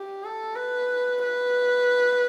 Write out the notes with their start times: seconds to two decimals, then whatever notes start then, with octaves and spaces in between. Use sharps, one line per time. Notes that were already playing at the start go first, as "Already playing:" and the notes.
Already playing: G4
0.24 A4
0.56 B4
1.23 B4